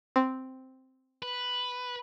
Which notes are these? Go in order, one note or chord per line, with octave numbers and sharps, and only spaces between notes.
C4
B4